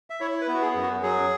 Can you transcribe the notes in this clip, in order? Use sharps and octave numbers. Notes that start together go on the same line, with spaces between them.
E5
E4 C#5
B4
B3
F#4
G#4
F#2
F#4
F#3 G#4